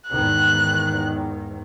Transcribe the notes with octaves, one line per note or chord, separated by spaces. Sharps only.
E2 G#2 D#3 F#6